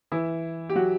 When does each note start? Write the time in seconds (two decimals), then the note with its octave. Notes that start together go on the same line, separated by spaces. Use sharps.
0.12 E3 E4
0.69 G4
0.75 F#3 F#4